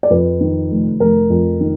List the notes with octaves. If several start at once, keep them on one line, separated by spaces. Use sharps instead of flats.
D5
F2 B4
D#3
F1
F1 A#4
F2
D#3